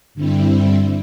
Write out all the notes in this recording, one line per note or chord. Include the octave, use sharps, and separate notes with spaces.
G2 D3 G3 C4 E4